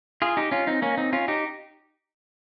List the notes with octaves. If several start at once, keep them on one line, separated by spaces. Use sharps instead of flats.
F4 G#4
D#4 G4
C#4 F4
C4 D#4
A#3 C#4
C4 D#4
C#4 F4
D#4 G4